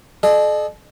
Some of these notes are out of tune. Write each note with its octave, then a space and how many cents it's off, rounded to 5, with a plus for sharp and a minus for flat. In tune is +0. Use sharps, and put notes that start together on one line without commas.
A4 -40 D#5 -40